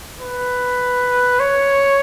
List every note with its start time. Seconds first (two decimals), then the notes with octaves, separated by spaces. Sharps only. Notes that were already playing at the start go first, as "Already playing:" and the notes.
0.21 B4
1.40 C#5